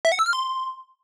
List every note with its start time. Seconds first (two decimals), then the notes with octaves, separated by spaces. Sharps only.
0.05 E5
0.12 F#5
0.19 E6
0.26 F6
0.33 C6